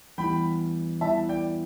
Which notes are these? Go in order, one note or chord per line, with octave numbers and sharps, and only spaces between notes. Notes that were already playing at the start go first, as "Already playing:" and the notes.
E2 E3 G3 G5 B5
E2 E3 G3 E5 A5
D5 G5